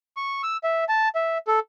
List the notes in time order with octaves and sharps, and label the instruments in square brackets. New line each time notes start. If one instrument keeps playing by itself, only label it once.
[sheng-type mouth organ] C#6
E6
E5
A5
E5
A4